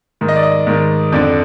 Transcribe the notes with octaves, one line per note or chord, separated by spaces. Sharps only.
G#2 D#3
D#5
D5
D#5
G#2 D#3
F2 D3 D5